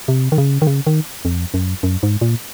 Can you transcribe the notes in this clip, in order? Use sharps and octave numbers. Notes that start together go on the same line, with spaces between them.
C3
D#3
C#3
D#3
C#3
D#3
F2
F#2
F#2
G#2
A#2